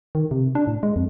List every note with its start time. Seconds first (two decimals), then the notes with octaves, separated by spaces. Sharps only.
0.15 D#3
0.31 C3
0.55 D4
0.67 A2
0.83 G#3
0.96 F2